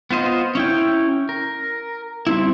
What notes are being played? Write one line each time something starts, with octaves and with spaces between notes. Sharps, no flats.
B3 F4 C5 D#5
C#4 E4 G5
A#4
G3 C4 E4